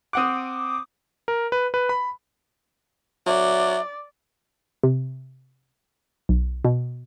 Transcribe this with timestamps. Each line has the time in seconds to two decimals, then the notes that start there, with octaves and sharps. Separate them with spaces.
0.13 C4 F#5 D6 D#6 F#6
1.28 A#4
1.52 B4
1.74 B4
1.89 B5
3.27 F#3 D5 E5
4.83 C3
6.29 B1
6.65 B2